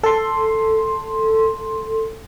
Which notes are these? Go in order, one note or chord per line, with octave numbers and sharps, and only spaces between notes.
A4 C6